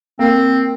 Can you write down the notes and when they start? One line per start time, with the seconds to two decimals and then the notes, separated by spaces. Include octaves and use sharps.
0.19 A#3 C4